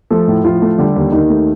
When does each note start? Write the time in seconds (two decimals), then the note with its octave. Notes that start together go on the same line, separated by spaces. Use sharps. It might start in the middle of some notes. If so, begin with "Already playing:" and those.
0.10 F3 A3 A4
0.28 A2
0.44 A2 F3 F4
0.62 A3
0.78 D3 G3 G4
0.96 D#2
1.12 D#2 D#3 D#4
1.30 A3